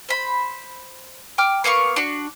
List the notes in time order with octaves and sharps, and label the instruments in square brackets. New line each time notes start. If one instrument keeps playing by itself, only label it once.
[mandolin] C5 B5
G5 D6 F6
A#3 B3 F5 C#6
D4 F#4